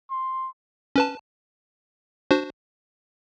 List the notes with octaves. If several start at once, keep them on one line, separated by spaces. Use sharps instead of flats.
C6
C#4 B4 A5
D4 F#4 C5